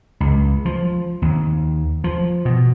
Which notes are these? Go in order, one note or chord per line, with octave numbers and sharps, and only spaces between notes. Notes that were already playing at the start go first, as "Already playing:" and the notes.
C#2
F3
D#2
F3
B2